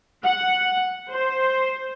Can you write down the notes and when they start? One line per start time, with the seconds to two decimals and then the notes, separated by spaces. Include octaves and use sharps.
0.24 F#5
1.10 C5